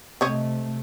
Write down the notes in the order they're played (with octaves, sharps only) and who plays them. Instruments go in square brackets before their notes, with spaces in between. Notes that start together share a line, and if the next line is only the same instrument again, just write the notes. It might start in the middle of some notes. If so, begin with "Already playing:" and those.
[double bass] C3 A3 [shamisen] C4 C#5 D#5